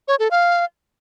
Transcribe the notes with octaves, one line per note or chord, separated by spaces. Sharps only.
C#5
A4
F5